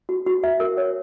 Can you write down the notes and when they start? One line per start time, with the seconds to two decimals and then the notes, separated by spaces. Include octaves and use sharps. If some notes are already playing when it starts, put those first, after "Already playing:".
0.09 F#4
0.27 F#4
0.44 E5
0.60 A#4
0.77 C#5